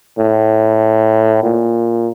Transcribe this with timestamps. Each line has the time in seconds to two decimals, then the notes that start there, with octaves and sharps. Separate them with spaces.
0.18 A2
1.43 A#2